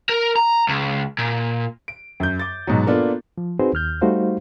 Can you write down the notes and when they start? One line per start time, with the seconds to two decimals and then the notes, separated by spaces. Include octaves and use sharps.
0.09 A#4
0.36 A#5
0.69 C#2
1.18 A#2
1.88 D7
2.20 F#2 G6
2.39 D6 A6
2.67 G#2 B2 F#3
2.87 A#3 B3 D4 F4 A4
3.38 F3
3.59 C4 D#4 F#4 G#4 B4 C5
3.73 D#2 F6 G6
4.01 G3 A3 D#4 F#4 C5 F5